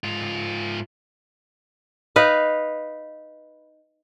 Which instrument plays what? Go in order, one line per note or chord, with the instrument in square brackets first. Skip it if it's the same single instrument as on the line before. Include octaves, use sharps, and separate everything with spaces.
[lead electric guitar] G#2 F4
[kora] D#4 B4 F5